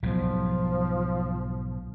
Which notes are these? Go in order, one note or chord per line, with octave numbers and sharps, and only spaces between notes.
B1 G#2 F3